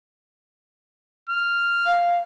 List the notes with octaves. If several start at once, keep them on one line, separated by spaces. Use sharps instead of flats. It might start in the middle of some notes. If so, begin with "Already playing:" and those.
F6
F5